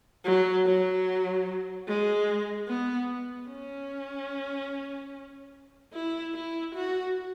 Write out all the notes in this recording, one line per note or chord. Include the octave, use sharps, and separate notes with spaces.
F#3
F#3
G#3
B3
C#4
E4
E4
F#4